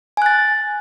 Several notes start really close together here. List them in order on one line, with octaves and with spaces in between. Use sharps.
G#5 F#6 A6